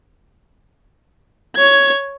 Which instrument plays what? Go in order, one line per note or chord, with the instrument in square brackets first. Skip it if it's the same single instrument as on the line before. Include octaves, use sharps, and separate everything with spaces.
[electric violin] C#5 G#6